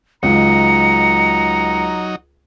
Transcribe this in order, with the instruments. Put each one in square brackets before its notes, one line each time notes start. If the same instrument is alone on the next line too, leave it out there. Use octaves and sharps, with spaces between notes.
[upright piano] C#2 [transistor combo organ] F#3 D#4 [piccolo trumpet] A#5 [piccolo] C#7